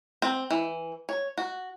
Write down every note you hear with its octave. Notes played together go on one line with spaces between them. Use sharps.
C4
E3
C#5
F#4